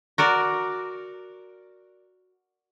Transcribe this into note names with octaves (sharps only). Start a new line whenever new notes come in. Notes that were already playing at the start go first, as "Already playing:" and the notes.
F#4 A#4 D5